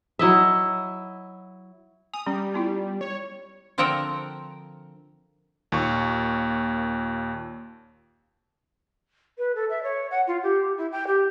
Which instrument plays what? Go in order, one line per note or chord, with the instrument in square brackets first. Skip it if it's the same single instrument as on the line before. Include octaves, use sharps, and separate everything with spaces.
[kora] F#3 E4 D#5 E5
[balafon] G#5 [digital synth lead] D#6
[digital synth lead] G3 [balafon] C#4
[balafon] B3 E4 F4
[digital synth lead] C#5
[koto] D3 F3 C4 A#4 F#5 G5
[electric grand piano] D#2 A#2 C#6
[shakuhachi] B4
A4
E5
C#5
F#5
F4
G4
E4
G5
G4